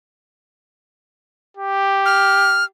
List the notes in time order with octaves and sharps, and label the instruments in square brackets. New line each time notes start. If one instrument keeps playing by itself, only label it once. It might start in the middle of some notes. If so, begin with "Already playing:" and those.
[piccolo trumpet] G4
[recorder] F6